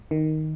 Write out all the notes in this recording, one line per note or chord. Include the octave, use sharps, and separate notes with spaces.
D#3